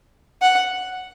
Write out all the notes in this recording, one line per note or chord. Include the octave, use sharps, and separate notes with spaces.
F#5